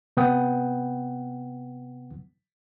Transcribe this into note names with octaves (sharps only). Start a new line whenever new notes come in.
C3 B3 B4 F#5 G5 D#6